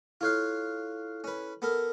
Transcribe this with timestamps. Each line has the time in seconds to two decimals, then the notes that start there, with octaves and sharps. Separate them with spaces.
0.21 E4 F4 A4 C#5 F5 F#6
1.24 C#4 B4
1.62 B3 A4 A#4